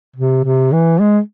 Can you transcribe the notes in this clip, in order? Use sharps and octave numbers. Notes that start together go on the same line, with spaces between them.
C3
C3
E3
G#3